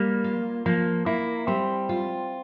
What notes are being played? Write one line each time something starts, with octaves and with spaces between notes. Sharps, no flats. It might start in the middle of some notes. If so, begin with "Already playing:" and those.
Already playing: G3 A#3
F4
F3 A#3
A#3 E4
G3 C4
F4